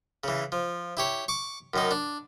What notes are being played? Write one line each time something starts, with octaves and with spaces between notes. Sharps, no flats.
C#3 E3
F3
E4 G4 C#5
C#6 D6
F#2 D#3 D#4
D4